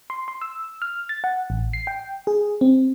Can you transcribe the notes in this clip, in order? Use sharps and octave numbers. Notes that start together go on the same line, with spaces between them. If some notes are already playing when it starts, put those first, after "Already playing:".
C6
C6
E6
F6
A6
F#5
A1
C7
G5
G#4
C4